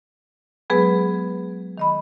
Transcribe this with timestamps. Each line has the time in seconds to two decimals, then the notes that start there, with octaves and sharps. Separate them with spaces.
0.70 F#3 G#3 B3 G#4 B4
1.78 D#3 D#5 B5